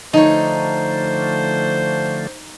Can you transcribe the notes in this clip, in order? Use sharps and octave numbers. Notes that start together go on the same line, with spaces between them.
D3 F3 A3 D#4 C5 C#5